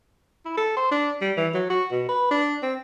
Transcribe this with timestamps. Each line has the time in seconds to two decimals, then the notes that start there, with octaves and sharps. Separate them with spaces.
0.45 E4
0.57 A4
0.77 C5
0.91 D4
1.21 G3
1.37 E3
1.54 F#3
1.70 F#4
1.91 B2
2.09 B4
2.31 D4
2.63 C4